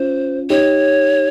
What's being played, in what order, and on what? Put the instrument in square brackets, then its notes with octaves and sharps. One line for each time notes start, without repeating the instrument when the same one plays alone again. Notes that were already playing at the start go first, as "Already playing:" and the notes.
Already playing: [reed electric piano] C#4 F4 [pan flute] C5
[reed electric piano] D#4 G4 [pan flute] C#5